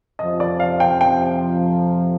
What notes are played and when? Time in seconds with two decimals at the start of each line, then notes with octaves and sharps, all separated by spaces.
0.19 F2 C3 F3 D#5
0.40 D5
0.60 F5
0.80 G5
1.01 G5